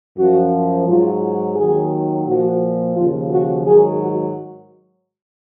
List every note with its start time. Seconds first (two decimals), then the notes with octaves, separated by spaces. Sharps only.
0.17 F#2 F3 F#4
0.86 G#2 F#3 F4
1.56 D#2 D#3 F#3 G#4
2.26 A#2 F3 F#4
2.96 D#2 C#3 F3 F4
3.31 F#4
3.65 G#2 D#3 F#3 G#4
4.00 F#4